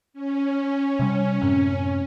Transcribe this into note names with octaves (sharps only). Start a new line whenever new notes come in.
C#4
C3 G3
F#2 A2 C3